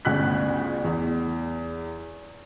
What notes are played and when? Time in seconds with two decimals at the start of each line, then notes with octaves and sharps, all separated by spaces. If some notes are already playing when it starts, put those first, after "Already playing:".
0.05 G1 D2 C#3 F#6 B6
0.84 E2